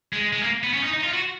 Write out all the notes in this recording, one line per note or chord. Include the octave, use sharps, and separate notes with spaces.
G#3
G#3
A#3
B3
C#4
D#4
D#4
F4
F#4